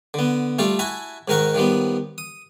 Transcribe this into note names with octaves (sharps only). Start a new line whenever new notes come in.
D3 B3
G3 A3 F4 A4
E4 F#4 E5 G#5 A5
G#2 D#3 D#4 A#4 F#5 C#6
D#3 F3 G3 B3
D#6